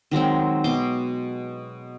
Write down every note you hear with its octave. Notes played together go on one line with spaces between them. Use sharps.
D#3 F#3 G#3 C4
B2 C6 D6